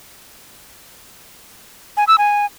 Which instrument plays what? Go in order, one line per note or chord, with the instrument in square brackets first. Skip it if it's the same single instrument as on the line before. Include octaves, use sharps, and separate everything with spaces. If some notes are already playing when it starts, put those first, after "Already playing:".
[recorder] G#5
E6
G#5